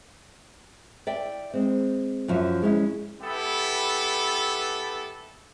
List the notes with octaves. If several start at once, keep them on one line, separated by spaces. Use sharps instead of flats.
D5 E5 G5
G#3 C4
F#2 F3 F#4 E5
G#3 C#4 E4
B3 E4 G4 A4